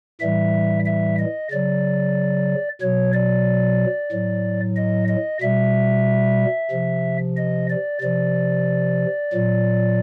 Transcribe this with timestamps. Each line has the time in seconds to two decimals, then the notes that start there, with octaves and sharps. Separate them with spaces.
0.20 A2 E3 G3 E5
0.86 E5
1.19 D#5
1.51 C#3 F#3 D5
2.82 B2 F#3 C#5
3.13 D5
4.12 A2 F#3
4.77 D#5
5.08 D#5
5.41 B2 G3 E5
6.71 C3 F3
7.37 D#5
7.70 D5
8.02 C3 F3 D5
9.33 A#2 F#3